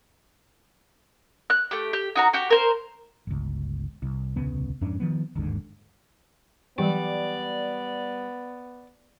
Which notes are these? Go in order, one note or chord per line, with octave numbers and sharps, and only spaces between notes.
F#6
A3 G4
G4
D#4 F#4 A#5
F#4 G4
A#4 C5
G1 C#2
C2
D#1 C2 C#3 B3
F2 G#2 C#4 D4
D#3 F3 B3
G1 D#2 G#2 D3
E3 F#3 G3 B3 D5